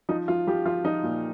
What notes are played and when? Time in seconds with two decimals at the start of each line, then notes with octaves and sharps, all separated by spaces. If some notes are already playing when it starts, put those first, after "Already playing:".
0.09 F3 D#4
0.28 F3 F4
0.47 F3 G4
0.65 F3 F4
0.84 F3 D#4
1.03 A#2